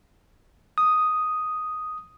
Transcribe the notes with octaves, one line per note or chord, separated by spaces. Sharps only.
D#6